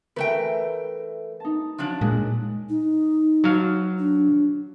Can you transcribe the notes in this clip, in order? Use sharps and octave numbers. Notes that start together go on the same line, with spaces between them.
E3 A3 A#4 B4 G5
D#4 A5
F3 F#3 D4
A#2 G#3 F#6
D#4
F#3 F5
D4